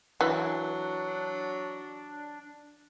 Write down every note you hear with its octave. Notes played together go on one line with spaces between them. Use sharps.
E3 F#3 D4